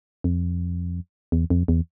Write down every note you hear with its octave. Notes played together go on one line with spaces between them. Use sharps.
F2
E2
F2
E2